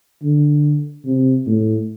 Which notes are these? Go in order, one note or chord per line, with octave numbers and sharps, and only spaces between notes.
D3
C3
A2